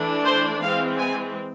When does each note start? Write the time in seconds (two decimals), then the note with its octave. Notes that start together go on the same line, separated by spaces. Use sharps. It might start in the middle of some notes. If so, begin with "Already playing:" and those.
Already playing: E3 A3 D4
0.24 C5
0.61 E3 G#3 C4 F5
0.98 G#5